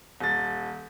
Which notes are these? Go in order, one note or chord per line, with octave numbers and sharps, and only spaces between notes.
D#1 A6